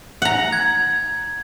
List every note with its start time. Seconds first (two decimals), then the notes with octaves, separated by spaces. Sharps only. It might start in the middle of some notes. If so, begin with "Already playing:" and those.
0.22 F#5 A#5
0.53 G#6